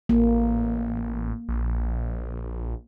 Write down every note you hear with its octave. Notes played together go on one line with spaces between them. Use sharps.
A1 A#3
A#1